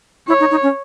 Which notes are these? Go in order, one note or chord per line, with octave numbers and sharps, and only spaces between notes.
E4 C#5
D#4
D#4
C#4